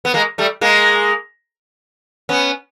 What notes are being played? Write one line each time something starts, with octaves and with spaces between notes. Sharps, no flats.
B3
G#3 A#3
G3 A3
G#3 A#3
B3 C#4